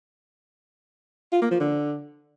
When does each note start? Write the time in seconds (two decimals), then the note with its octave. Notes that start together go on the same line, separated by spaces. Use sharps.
1.33 F4
1.42 A#3
1.51 F3
1.60 D3